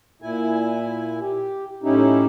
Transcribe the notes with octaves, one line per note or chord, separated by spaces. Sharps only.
A#2 E4 G#5
G4
A2 C#4 D#4 E4 G4